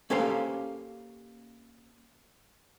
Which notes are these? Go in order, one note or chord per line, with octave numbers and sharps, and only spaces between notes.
A#3 C#4 G4 A4 C5 F5